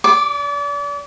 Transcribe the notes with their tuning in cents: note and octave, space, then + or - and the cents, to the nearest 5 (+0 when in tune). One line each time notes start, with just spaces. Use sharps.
D5 -35 D6 +0